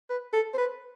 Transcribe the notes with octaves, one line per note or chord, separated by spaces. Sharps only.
B4
A4
C5
B4